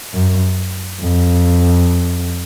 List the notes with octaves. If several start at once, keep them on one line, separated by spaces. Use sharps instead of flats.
F#2
F2